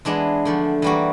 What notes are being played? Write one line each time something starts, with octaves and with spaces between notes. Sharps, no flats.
E3 G#3 B3 D4
D3 F3 A3
E3 G3 A#3 F#4